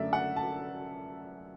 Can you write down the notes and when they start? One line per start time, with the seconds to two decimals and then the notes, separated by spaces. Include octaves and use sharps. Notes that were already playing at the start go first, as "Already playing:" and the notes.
Already playing: F#2 D3 A3 D5 E5
0.13 F#5
0.36 A5